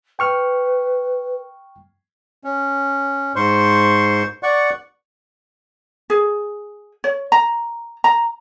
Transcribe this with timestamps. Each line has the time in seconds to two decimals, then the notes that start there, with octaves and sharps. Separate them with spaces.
0.19 B4 G5 C#6 F6
2.44 C#4
3.36 G#2 C5 C6 C#6
4.43 D5 F#5 C#6
6.10 G#4
7.04 C#5
7.32 A#5
8.04 A#5